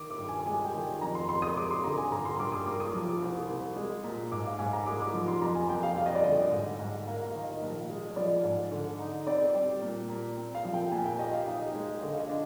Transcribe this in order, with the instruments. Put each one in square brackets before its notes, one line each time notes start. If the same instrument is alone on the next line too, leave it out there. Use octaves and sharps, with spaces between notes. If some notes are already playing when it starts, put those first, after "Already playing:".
Already playing: [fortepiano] D#3 [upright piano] D6
[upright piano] D6
[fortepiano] G2
[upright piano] G#5
[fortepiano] G#3 [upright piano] G#5
[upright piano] G5
[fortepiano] D#3
[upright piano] G#5
[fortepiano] F2 [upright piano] A#5
[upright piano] C6
[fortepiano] F2 [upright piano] C6
[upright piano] D#6
[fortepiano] G#3 [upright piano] D6
[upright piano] C6
[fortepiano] D3 [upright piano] A#5
[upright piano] G#5
[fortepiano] G2 [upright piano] A#5
[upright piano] C6
[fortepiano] G2 [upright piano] D6
[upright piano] D#6
[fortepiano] A#3 [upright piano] D6
[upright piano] D#6
[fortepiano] F3 [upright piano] D6
[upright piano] D6
[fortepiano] C2
C2
G#3
A#2
[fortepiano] G#2 [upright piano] D6
[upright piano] F5
[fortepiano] G#2 [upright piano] G#5
[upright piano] A#5
[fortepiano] G#3 [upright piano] D6
[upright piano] D6
[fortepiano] F3
[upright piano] C6
[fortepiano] F2 [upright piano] A#5
[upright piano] G#5
[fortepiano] F2 [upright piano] G5
[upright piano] F5
[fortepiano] G3 [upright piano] F5
[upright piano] D#5
D5
[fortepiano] D3 [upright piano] D#5
[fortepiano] G#2
G#2
[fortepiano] A#3 [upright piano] F5
[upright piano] F5
[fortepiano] D#3
[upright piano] D#5
[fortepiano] A#1
G#3
[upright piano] D#5
[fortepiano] F3 [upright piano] D5
[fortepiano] G#2
D3
D#4
[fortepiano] C4 [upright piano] D5
[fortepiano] G3
A#2
A#2
C4
[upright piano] F5
[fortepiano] F3
[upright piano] G5
[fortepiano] A#2 [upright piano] G#5
[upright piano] G5
[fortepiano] G4 [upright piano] D#5
[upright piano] F5
[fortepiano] D#4 [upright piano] D#5
[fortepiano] G#3
[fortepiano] D3 [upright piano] D#5
[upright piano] F5
D#5
[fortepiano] D4